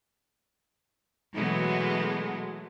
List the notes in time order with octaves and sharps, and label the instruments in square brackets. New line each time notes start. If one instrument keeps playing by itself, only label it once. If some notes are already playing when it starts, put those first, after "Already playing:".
[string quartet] B2 E3 F#3 G#3 A3 B3